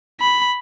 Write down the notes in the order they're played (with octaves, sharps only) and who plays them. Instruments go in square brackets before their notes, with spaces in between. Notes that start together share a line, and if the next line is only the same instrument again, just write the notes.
[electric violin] B5